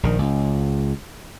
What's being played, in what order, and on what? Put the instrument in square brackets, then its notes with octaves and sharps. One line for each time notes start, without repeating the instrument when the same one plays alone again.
[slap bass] A#1 D#3
C#2